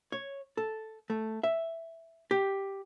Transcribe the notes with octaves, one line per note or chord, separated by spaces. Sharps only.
C#5
A4
A3
E5
G4